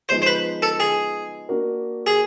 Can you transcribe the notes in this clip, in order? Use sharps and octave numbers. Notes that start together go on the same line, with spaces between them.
F3 G#3 B3 D#4 C5
C5
B4
A4
G#4
A#3 D4 F#4 A#4
G#4